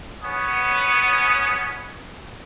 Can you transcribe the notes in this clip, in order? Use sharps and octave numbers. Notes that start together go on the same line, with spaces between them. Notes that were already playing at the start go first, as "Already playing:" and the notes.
B3 C#4 C#5 D#6